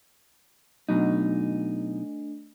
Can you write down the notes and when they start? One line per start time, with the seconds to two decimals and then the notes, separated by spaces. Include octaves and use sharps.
0.89 B2 F#3 A3 D4 D#4